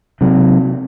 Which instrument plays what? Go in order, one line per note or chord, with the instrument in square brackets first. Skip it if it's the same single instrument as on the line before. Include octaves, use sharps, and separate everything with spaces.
[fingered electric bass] C3 F#3